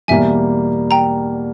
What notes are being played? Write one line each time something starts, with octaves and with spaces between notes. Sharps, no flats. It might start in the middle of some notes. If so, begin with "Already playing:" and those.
E2 B2 G3 A#3 E5 G#5
G5 A#5